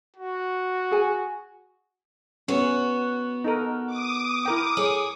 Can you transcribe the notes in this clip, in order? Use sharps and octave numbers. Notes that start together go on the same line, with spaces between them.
F#4
G#4 G#5
B3 C#4 F#4
D#4 A4 A#4
D6 D#6
E4 A#4 G5
G#4 C#5